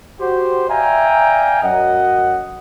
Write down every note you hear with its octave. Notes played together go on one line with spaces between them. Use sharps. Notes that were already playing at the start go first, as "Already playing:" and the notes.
F#4 G4 C5
D5 E5 F5 G5 G#5 A#5
F#2 D#5 F#5